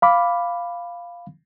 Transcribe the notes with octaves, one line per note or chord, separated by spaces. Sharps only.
F5 B5 D6